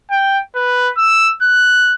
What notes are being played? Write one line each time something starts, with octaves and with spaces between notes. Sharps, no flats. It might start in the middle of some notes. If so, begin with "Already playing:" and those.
G5
B4
E6
F#6